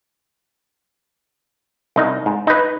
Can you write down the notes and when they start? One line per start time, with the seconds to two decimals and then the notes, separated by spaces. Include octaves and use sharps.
1.96 C2 D#4
2.26 G#2
2.47 D#4 B4